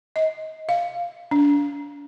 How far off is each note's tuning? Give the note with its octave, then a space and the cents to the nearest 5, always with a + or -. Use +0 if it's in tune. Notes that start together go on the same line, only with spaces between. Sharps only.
D#5 +25
F5 +0
D4 -35